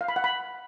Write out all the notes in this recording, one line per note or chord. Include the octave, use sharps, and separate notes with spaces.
F5
B5
F#5
B5